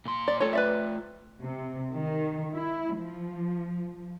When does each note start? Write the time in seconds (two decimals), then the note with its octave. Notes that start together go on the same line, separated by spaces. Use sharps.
0.05 A#2 C6
0.28 D5
0.40 A3 F4 A4 C#5
0.53 B4 D5 E5
1.42 C3
1.95 D#3
2.53 E4
2.96 F3